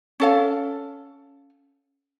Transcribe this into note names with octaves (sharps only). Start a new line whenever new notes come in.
C#4 A4 F5